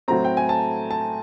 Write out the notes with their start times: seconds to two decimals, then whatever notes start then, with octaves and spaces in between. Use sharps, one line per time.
0.08 A2 F#3 A3 C4 A#5
0.24 G5
0.37 G#5
0.49 A5
0.91 A5